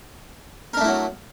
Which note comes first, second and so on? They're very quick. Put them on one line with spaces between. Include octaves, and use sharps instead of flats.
A#4 D4 A3 E4 F#3